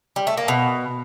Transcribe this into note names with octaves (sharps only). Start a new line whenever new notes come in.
G3
A3
A#3
B2